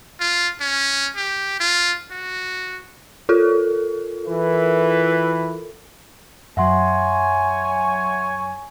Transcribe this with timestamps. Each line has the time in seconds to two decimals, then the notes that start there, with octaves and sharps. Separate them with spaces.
0.20 F4
0.60 C#4
1.16 G4
1.60 F4
2.11 F#4
3.29 F4 A4 A#4
4.27 E3 E4 B4
6.57 F#2 F#3 C#5 E5 F#5 G#5 C6